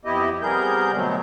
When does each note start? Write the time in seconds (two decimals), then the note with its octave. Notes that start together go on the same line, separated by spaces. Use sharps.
0.05 F2 B3 E4 G4 D#5
0.42 C3 G3 B3 G#4 A#4 G6
0.94 B2 D3 F#3 A3 B3 C4